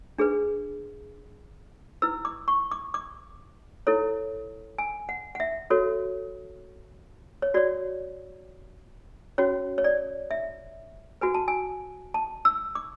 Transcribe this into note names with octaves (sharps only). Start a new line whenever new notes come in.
D4 G#4 B4
E4 B4 E6
D6
C#6
D6
D6
E4 A4 C#5
G#5
F#5
F#5
E5
F#4 A4 C#5
C#5
F#4 C#5 D5
C#4 F#4 C#5
C#5
D5
E5
F#4 B4 G#5
A5
G#5
A5
E6
D6